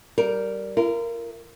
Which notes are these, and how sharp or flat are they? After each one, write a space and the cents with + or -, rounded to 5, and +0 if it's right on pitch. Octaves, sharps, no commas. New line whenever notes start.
G3 -15 A#4 +0
F4 -45 A#4 +0